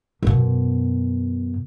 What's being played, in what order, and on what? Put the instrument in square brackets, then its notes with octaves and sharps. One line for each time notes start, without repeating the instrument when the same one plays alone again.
[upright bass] F#2 B2